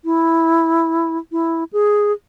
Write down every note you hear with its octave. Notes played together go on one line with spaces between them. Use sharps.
E4
E4
G#4